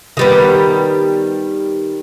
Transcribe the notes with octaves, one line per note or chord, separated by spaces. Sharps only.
D#3 G3 B3